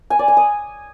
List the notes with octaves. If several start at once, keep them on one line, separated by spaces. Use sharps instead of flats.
G#5
D5
G#5
D#6